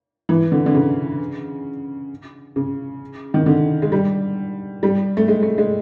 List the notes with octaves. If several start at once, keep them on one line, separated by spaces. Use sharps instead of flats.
E3
D3
D3
C#3
C#3
D#3
D3
G#3
G3
G3
A3
G#3
A3
G#3